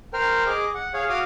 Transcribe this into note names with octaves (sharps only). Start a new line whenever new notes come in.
A#4 C5 G5 F6
G#4 D#5 D6
F#5
G#4 C#5 F5
F#4 F5 D6 D#6 F6